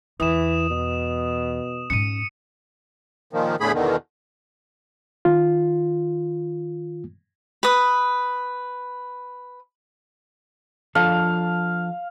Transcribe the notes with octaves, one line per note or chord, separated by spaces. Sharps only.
E2 E3 D#6 E7
B2
G#2 C#4 C#7 D#7
A#2 D#3 F3
E2 A2 D3 A3 G#4 B5
E2 B2 D3 D#3
D#3 F4
B4 D#6
F3 D4 A4 F5